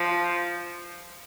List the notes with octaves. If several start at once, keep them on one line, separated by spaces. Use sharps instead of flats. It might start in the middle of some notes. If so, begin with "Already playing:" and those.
Already playing: F3